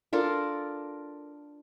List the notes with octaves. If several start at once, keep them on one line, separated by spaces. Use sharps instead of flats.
D4 F4 A4 A#4